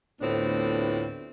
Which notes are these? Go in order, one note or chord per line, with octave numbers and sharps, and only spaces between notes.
D2 A2 B3 C4 D4 F4